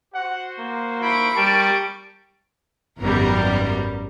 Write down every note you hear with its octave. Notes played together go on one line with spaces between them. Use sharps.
F#4 C5 F#5
A#3
E4 C5 B5 C#6 D7
G3 A#4 A5
G#1 F#2 G3 B3 A#4